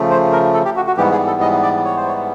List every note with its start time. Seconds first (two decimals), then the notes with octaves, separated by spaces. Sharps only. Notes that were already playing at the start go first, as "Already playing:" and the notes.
Already playing: C#3 F3 A3
0.11 C5
0.32 A#4
0.54 A4
0.65 G4
0.76 F#4
0.87 F#4
0.97 G#2 E3 G3 B3 G4
1.12 G#4
1.27 A4
1.41 D#5
1.63 D5
1.84 C#5
1.96 C5
2.07 C#5